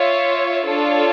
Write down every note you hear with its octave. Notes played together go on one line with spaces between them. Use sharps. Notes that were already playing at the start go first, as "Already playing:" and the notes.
Already playing: F4 C#5 E5
D4 F4 A4 C#5